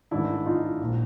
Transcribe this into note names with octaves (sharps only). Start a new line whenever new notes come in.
A1 G#2 D#3 D4 E4
D#4 F4
A#1 A#2